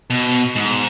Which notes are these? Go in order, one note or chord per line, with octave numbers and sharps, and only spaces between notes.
B2
G#2